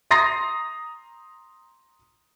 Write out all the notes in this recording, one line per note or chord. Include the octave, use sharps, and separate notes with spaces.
A#5 C6 D#6 A#6 C7